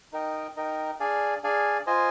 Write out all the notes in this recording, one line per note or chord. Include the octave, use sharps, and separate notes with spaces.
D#4 A#4 D#5 G5
D#4 A#4 D#5 G5
D4 G#4 D5 F5 G#5
D4 G#4 D5 F5 G#5
F4 C5 D#5 G#5